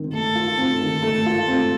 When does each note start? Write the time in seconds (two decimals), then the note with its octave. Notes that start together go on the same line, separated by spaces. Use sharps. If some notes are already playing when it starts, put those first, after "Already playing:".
Already playing: D#3 C4
0.13 A3 A4
0.35 F4
0.58 C4
0.81 D#3
1.03 A3
1.26 F4
1.48 C4